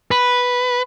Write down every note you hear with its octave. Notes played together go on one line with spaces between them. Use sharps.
B4